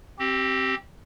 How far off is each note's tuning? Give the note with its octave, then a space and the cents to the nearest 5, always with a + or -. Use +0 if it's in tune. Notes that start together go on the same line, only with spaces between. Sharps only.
C4 +15 G4 -20